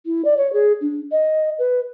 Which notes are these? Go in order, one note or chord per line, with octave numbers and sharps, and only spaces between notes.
E4
D5
C#5
G#4
D4
D#5
B4